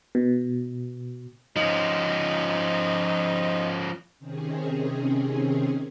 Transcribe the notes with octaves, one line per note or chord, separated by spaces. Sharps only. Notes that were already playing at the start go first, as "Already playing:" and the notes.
B2
F3 C#4 D#4
C3 D#3 C4 C#4 G#4